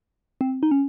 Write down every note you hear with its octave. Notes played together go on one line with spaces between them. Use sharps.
C4
D#4
C#4